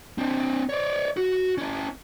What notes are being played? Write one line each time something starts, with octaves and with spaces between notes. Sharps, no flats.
C4 D4
C#5 D5
F#4
C#4 E4